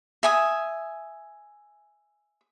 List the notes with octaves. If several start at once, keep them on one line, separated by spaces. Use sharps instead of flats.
E5 G#5 D#6